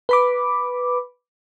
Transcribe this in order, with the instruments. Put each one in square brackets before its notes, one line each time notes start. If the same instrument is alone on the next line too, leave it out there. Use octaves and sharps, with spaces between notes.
[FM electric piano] B4 B5 D6